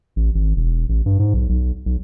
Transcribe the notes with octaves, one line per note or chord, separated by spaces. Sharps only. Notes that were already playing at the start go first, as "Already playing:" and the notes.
A1
G#1
E1
A1
G2
G#2
B1
B1
B1